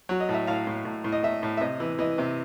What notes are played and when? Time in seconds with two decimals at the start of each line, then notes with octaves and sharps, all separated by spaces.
0.09 F#3
0.20 D#5
0.29 A2
0.34 E5
0.47 A2 F5
0.67 A2
0.85 A2
1.04 A2
1.12 D#5
1.23 A2 E5
1.43 A2
1.57 E5
1.61 C3 D#5
1.80 E3
1.99 E3 D#5
2.18 C3